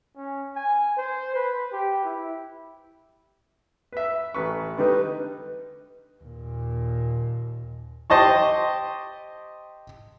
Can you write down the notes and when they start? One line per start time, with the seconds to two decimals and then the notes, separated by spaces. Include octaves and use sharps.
0.16 C#4
0.55 G#5
0.97 C5
1.35 B4
1.72 G4
2.04 E4
3.92 B4 E5
4.35 A1 B4 C#6
4.78 D3 G3 D#4 B4
6.22 D#2 A#2
8.10 G4 C5 D#5 A5 C#6